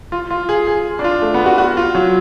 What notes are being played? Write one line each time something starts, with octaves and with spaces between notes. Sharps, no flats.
F4
F4
G#4
G#4
D4
F4
A3
B3
F#4
F#4
F4
F#3